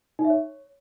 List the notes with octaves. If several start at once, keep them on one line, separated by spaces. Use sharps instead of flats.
D#4
E5
C#5